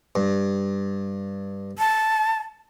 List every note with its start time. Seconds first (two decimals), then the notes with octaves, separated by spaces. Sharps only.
0.16 G2
1.79 A5